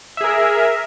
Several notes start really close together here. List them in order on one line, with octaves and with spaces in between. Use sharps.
E5 G#4 A#4